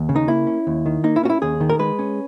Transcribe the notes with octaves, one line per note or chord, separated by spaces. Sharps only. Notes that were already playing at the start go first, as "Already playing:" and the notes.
Already playing: D#2
C#3
D#4
A#3 E4
C#4
D#2
D#3
A#3 D#4
E4
C#4 F#4
E4
D#2 G#4
D#3
A#4
G#3 B4
C#4